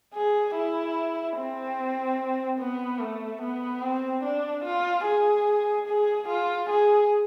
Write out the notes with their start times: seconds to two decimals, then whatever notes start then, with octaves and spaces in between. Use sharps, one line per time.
0.14 G#4
0.55 E4
1.37 C4
2.60 B3
3.00 A3
3.42 B3
3.82 C4
4.24 D4
4.65 F4
5.05 G#4
5.88 G#4
6.29 F4
6.70 G#4